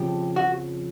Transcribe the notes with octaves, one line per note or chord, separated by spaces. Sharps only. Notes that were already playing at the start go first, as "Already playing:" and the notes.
Already playing: F2 C#3 F3 G4
F#4